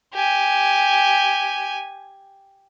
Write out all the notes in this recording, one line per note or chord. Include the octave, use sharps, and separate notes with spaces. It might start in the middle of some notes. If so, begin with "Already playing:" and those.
G4 G#5